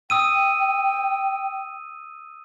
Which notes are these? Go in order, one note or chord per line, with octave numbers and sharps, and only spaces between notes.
G5 D#6 E6 D#7